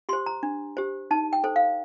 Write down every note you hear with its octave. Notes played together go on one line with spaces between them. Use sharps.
G4 C5 C6
A#5
D4
G4 C5
D#4 A5
G5
A4 C5
F5